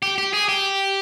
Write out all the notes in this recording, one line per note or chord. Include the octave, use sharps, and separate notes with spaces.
G4
G4
G#4
G4